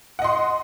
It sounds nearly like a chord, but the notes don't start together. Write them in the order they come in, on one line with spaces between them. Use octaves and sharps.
F#5 D#5 C6